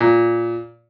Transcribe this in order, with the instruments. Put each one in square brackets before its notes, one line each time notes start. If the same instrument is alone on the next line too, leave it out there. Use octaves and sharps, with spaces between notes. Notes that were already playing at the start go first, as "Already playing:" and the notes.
[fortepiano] A#2